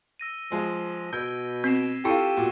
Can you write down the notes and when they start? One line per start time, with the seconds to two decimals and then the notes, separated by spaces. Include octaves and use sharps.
0.20 E6 A#6 D#7
0.52 F3 G#3
1.13 B2 E6 G6 G#6
1.64 C4 B6 C7 E7
2.05 E4 F4 G4 A4 C#6 E6 D#7
2.37 A#2 F#4